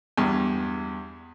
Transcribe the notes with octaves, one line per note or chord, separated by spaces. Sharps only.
E2 G2